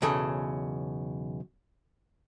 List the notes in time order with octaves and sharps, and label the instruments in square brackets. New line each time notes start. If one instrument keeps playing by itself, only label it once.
[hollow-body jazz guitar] B1 E2 C#3 G#4 A4